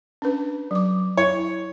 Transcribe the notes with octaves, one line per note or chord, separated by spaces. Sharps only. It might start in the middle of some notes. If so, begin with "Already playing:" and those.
C#4 D4 B4
F#3 D6
E4 C#5